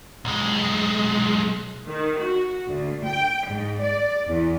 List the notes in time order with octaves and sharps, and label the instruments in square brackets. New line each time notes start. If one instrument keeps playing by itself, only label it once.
[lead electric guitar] B1 G#3
[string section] D#3
F#4
D2
G5
G#2
D5
E2